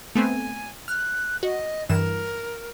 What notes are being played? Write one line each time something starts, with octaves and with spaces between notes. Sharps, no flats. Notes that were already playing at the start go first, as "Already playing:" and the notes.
A3 B3 C4 G#5
F6 F#6
F#4 D#5
G2 E3 A#4 E7